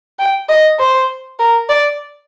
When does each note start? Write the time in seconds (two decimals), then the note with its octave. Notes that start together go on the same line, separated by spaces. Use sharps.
0.19 G5
0.49 D#5
0.79 C5
1.39 A#4
1.69 D5